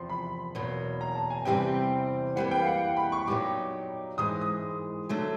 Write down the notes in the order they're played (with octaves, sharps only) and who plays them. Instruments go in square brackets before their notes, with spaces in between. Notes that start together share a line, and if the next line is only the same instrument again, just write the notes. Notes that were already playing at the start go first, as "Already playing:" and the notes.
Already playing: [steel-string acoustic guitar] E2 C3 F3 [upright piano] C6
[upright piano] B5
[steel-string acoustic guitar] E2 B2 F#3 A#3
[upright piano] A#5
A5
G#5
[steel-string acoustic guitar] E2 C3 E3 G3 C4 [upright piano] G5
[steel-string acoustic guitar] E3 G3 A#3 [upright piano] F#5
[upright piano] G5
F5
F#5
B5
C#6
[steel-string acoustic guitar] A#2 F#3 B3 D#4 G4 [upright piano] D6
[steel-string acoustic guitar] G#2 E3 G#3 [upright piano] D#6
[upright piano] D#6
[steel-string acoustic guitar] D3 F#3 A3